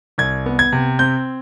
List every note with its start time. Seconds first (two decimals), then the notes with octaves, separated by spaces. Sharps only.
0.18 C2 G#6
0.46 B3
0.59 G#6
0.72 C3
0.99 C4 G6